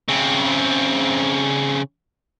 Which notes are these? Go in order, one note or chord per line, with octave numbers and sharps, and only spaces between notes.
C#3 C4